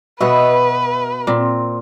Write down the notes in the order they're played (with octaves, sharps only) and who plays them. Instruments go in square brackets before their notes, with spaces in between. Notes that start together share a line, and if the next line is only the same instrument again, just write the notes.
[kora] B2 B3 [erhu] B4 [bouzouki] D#5 E5
[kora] A#2 [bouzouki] C4